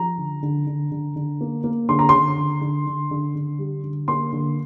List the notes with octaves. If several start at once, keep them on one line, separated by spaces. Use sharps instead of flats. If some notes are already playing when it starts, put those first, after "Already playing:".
Already playing: F3 A#5
D3
D3
D3
D3
D3
A#3
A#3
D3 C6
A#5
D3 C6
D3
D3
D3
D3
D3
G3
D3
A#3 C6
D3